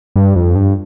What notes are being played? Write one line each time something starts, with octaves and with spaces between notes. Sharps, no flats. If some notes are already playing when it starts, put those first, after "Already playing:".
G2
F2
G2